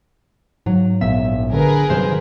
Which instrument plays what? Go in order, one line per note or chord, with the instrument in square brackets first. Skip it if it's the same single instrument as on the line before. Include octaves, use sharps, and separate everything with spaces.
[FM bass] G#2 [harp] F#3
[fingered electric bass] A#1 A#2 B3 [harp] E5
[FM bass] D3 [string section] G#4 A#4 B4
[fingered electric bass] G2 D#3 F#3 [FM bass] C3 [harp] C5